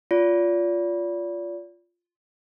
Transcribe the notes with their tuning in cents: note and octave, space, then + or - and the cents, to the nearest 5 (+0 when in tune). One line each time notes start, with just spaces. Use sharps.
F4 +0 D5 -35